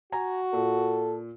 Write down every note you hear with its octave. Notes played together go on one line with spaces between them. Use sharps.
F#4 G#5 A#5
A#2 A4